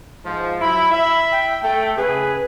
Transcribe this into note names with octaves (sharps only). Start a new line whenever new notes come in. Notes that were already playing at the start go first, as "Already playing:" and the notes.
G#2 F3
F#3 E4 B5
E4 E5
G5
A3 G5
C#3 G#4 B4